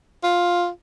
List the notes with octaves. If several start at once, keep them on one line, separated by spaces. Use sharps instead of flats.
F4